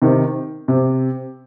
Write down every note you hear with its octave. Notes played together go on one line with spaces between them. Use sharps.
C3 D#3
C3